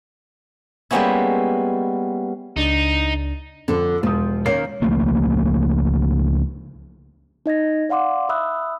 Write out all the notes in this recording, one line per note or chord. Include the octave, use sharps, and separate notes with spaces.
G3 G#3 A#3 B3 C#4 E4
C#2 D4 D#4
F2 D3 A4
E1 F3 D#6
D#3 A#3 C#4 C7
C#2 F3 A3 A#3
D#4 D#5 G#6 A#6
D5 F5 F#5 C6 D6
E5 B5 D#6 E6 F#6